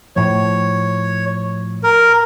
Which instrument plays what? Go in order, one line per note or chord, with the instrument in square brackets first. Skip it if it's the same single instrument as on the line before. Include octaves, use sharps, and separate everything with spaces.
[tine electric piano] A2 F3 [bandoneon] C#5
[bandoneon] A#4